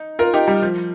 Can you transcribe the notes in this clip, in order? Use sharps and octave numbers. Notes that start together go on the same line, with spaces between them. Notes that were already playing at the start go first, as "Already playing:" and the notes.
Already playing: D#4
F4 A#4
D#4 G4
G3
F3